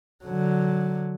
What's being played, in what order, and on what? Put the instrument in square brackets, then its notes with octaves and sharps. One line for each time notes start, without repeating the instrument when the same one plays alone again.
[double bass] D3 F#3